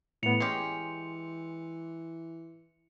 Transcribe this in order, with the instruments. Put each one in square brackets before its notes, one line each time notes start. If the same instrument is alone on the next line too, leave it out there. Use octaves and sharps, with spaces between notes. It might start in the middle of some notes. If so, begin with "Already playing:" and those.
[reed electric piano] A2 B3 [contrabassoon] E3 [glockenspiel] C#7 F7
[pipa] G#3 C#4 G4 [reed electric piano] C6